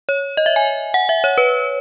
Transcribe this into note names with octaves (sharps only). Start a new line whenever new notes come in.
C#5
D#5
E5
G#5
F#5
E5
C#5
B4